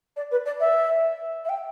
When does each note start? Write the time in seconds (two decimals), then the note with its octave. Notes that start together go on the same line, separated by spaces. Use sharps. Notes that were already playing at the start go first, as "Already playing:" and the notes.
0.16 D5
0.31 B4
0.46 D5
0.60 E5
1.45 E5
1.49 G5